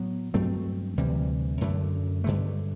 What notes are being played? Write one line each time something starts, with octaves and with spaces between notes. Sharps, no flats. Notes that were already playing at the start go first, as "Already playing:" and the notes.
Already playing: A2 F#3 B3
G2 F#3 A3 C4
D2 C3 E3 G3
F#2 D3 A3
G2 D3 A3